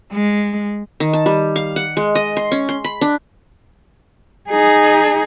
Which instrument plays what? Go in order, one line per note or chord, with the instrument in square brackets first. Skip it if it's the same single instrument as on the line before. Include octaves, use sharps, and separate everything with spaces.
[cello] G#3
[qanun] D#3
A5
G3
F5
F#5
G#3
D#5
C6
C#4
C6
B5
D4
[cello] D#4 G#4